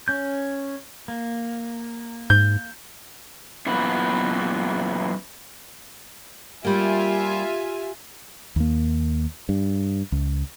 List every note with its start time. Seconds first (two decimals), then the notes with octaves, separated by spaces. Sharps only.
0.08 C#4 G6
1.08 A#3
2.30 G#2 G6
3.66 F#2 A#2 E3 B3
6.65 G3 A#3 F4 G4 E5 G#5
8.56 D#2 A#3
9.49 G2
10.12 C#2